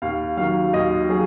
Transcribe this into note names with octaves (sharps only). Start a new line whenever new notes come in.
D#2 F5
D#3 F#3 F5
D#2 D#5
F#3 G#4